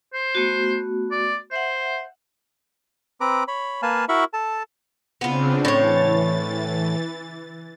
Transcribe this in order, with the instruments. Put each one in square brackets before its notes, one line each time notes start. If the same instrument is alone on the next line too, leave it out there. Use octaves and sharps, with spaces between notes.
[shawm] C5
[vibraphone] A3 B3 F#4
[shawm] D5
[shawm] C5 [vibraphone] E5 F#5
[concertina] C4 B4 A#5 D6
C#5 B5
A#3 B4 F5 G#5 A5
E4 F#4 A#4 E5 B5 C#6
A4 A5
[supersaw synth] C#3 C4 D4 [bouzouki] B3 F4
[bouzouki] A2 C#5 [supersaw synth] E3 A6